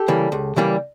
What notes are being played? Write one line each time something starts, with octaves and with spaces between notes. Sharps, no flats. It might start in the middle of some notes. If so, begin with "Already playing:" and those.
Already playing: G4 A4
C#3 E3 G3 A#3
C#2
C#3 E3 G3 A#3